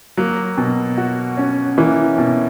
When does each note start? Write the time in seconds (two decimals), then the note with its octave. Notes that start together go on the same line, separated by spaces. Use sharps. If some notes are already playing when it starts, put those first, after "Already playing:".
0.17 F#3 A#3
0.58 B2
0.97 F#4
1.37 C#4
1.77 E3 A#3
2.18 B2